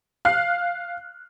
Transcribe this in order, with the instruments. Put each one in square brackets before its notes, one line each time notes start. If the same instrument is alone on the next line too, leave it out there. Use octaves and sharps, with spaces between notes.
[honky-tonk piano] F5 F6 F#6 C7